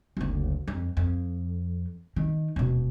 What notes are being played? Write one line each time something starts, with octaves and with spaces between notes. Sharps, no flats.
F#1 D2
F2
F2
D#3
D#1 B2